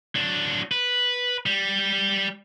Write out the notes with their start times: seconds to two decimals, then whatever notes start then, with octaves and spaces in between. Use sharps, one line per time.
0.15 F#3 D4
0.72 B4
1.46 G3